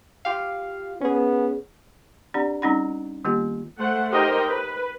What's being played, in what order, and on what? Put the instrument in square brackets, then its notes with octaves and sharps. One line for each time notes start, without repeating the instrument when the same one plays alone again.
[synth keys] F4 G4 F5
[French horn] B3 [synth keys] C#4 G#4
[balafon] C4 D4 G4 D5 F#5 B5
G3 C4 C#4 D#4 F#5 B5
D#3 G3 A#3 B3 F4 G4
[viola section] A3 C5 F#5
D#4 G4 A#4 C5 D#5 G5
B4